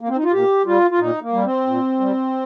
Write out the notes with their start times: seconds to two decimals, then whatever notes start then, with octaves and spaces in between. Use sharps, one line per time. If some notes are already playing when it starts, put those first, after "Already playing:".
0.01 A#3
0.09 C4
0.16 D#4
0.24 F4
0.32 A#2 G4
0.66 G3 F4
0.91 F4
0.99 A#2 D#4
1.22 A#3
1.33 G3
1.44 C4
1.67 A#2
2.00 G3